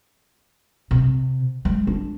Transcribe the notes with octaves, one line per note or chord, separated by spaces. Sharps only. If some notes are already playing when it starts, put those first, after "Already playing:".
C3
G#3
D4